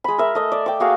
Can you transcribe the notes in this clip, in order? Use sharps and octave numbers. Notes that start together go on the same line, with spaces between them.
G#3 B5
A#4 E5
A3 D#5 E5
D5
G5 D6
A#3 F#4 G#4 F5